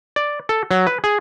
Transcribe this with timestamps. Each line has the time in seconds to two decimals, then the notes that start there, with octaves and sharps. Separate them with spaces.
0.16 D5
0.49 A4
0.71 F#3
0.87 B4
1.04 G#4